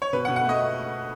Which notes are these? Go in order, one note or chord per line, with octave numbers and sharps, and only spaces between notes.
C#5
B2 B4
F#5
B2
F#5
A3 D#5